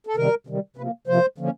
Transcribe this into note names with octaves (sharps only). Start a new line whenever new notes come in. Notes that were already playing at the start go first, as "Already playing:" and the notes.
A4
C3 D#3 G3 A#4
C3 D#3 G3
C3 F3 A#3 B4
C3 F3 A#3 C5
D3 F3 A#3 C#4